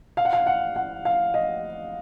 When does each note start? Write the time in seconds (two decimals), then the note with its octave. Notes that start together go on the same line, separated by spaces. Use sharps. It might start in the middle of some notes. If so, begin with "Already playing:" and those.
0.17 F5
0.25 F#5
0.33 F5
0.46 F#5
0.76 F#5
1.05 F5
1.34 D#5